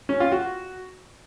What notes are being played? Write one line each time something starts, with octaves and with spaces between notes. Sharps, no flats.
C#4
F4
F#4